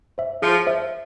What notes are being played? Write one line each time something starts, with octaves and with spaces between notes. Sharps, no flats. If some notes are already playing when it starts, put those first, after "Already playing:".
C5 E5
F3 G#4
C5 E5